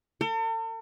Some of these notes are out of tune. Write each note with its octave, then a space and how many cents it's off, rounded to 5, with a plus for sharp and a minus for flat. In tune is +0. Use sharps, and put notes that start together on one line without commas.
A4 +45